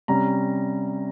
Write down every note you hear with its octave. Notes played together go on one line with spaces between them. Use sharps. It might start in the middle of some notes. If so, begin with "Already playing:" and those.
C3 G3 C#4 A#5